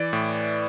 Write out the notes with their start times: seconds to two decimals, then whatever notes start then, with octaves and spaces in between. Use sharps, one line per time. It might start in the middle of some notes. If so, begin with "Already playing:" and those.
Already playing: E3 D5
0.13 A2